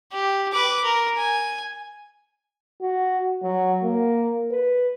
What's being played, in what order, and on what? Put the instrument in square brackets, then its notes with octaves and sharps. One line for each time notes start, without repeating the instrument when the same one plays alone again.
[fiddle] G4
B4 D6
A#4
G#5
[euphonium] F#4
F#3
A#3
B4